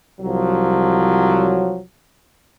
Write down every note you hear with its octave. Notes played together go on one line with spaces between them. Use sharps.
C2 F3 F#3